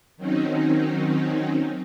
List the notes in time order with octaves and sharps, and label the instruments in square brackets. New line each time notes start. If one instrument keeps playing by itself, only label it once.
[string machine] D#3 F#3 C4 C#4 D#4